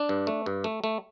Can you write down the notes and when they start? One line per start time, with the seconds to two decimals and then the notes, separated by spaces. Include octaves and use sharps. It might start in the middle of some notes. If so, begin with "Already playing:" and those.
Already playing: D4
0.09 G2
0.27 A3
0.46 G2
0.64 A3
0.84 A3